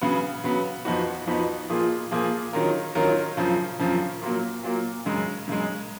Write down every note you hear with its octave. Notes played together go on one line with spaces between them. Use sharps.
C#3 F#3 B3
C#3 F#3 B3
F2 F3 B3 D#4 F#4
F2 F3 B3 D#4 F#4
A#2 F3 A#3 F4 G#4
A#2 F3 A#3 F4 G#4
D#3 F#3 C#4 F4 A#4
D#3 F#3 C#4 F4 A#4
F#2 C#3 F3
F#2 C#3 F3
A#2 F#3 A#3
A#2 F#3 A#3
F#2 C#3 G#3
F#2 C#3 G#3